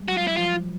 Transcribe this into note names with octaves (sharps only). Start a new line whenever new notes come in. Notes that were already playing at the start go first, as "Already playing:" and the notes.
Already playing: G3 G#3
F#3 F#4
F4
E4
F3 F4